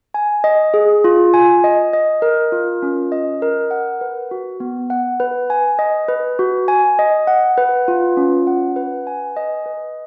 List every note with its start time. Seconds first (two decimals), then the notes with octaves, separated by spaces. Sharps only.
0.14 G#5
0.44 D#5
0.74 G#4
1.04 F4
1.34 G#5
1.64 D#5
1.93 D#5
2.22 A#4
2.52 F4
2.82 C#4
3.12 D#5
3.42 A#4
3.71 F#5
4.01 B4
4.31 F#4
4.60 B3
4.90 F#5
5.20 B4
5.50 G#5
5.79 D#5
6.08 B4
6.39 F#4
6.68 G#5
6.99 D#5
7.27 F#5
7.58 B4
7.88 F4
8.17 C#4
8.47 F#5
8.76 B4
9.07 G#5
9.37 D#5
9.66 B4